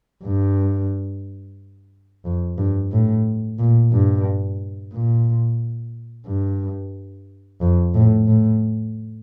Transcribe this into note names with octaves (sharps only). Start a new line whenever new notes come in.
G2
F2
G2
A2
A#2
G2
A#2
G2
F2
A2
A2